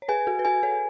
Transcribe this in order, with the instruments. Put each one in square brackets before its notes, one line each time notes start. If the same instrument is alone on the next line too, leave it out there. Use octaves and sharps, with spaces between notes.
[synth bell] C#5
[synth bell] G#4 B4 [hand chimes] G#5
[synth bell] F#4 A4
B4
[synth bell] F#4 A4 [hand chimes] G#5
[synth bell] A4 C#5